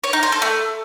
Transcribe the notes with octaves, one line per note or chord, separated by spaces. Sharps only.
C#5
D#4
C5
A4
A3